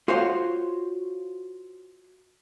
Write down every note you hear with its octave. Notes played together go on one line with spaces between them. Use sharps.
F4 F#4 C5 C#5 F5